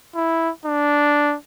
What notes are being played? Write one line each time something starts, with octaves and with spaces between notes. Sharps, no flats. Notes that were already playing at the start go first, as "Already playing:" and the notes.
E4
D4